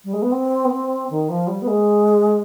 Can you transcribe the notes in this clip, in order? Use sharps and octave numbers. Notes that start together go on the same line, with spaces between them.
G3
G#3
B3
C4
B3
C4
D#3
F3
G3
B3
G#3